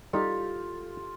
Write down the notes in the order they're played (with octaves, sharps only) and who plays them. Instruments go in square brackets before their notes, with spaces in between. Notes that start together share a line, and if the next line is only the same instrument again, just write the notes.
[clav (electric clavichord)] G3 D#4 [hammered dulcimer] F4 [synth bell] G4 A4